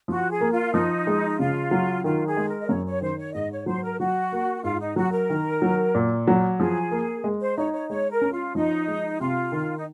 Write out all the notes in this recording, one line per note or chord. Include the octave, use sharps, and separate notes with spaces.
F3 F#4
G#4
A#3
F4
F3 D#4
G#3
C#3 F4
F#3
D#3 F4
G#4
G#3
A#4
D#5
F#2 C#5
C#5
D#3 C5
C#5
G#2 D#5
C#5
F#3 C5
A#4
F#3 F#4
A#3
G#2 F4
D#4
F#3 F#4
A#4
D#3
F#3
A#2
F#3
F3 G#4
A#3
G#3
C5
D#4 C#5
C#5
G#3 C#5
A#4
C#4
F4
F3 D#4
G#3
C3 F4
D#3
D#4